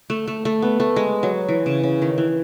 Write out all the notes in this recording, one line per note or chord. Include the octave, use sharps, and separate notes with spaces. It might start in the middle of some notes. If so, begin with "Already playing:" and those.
A3
A3
A3
B3
A3
G#3
F#3
E3
C#3
C#3
D#3
E3